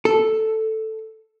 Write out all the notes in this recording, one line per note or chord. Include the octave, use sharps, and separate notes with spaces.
A4